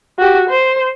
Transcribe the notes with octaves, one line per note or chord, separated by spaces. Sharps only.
F#4 G4
C5